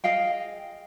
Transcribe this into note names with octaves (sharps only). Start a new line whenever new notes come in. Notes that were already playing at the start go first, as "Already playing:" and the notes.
G#4 D#5 F5 G5